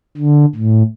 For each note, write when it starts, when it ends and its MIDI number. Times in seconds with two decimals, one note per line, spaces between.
0.17 0.45 50
0.55 0.83 45